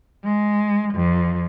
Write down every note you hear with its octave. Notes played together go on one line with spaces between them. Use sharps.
G#3
F2